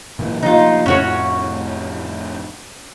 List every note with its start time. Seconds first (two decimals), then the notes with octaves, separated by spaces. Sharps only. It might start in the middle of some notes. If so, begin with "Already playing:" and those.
0.19 A#2 E3
0.42 C3 F3 A#3 D#4 F4
0.86 F2 A2 C3 C#4 F#4 C#5